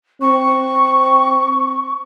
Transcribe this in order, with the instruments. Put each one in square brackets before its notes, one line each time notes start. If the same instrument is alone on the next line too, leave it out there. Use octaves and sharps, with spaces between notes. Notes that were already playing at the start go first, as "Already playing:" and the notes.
[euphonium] C4 [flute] C#6